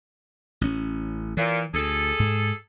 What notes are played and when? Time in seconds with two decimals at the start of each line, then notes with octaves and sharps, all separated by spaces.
0.61 A1 C#4
1.37 A#2 E3
1.74 D2 G#4 A4
2.19 G#2